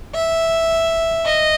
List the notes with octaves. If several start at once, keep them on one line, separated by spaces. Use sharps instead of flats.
E5
D#5